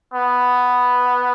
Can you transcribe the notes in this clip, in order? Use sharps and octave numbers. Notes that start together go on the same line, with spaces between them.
B3